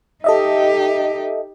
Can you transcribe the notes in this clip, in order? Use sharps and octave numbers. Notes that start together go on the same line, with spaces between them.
D#4 G4 A4 D#5 E5